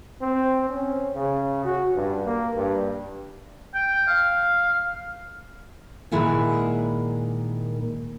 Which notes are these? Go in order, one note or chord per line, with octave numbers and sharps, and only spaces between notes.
C4
C#4
C#3
F#4
G2
A#3
G2
G5
F5
A#2 D#3 G#3 E4 F#5 G#5